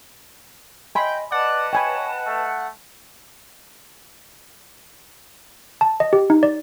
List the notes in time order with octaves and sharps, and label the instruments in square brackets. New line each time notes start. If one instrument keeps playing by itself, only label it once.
[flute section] D#5 [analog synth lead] G5 [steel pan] G#5 B5 C6
[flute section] B4 D#5 A5 [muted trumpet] D5 [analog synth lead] F#5
[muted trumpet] C#5 [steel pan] G5 G#5 B5
[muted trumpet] A3
[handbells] A5
D#5
G4
D#4
D5